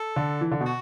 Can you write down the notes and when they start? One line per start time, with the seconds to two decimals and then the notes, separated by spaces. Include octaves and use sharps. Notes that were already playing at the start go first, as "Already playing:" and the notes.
Already playing: A4
0.16 D3
0.41 E3
0.51 D3
0.60 B2
0.66 F#4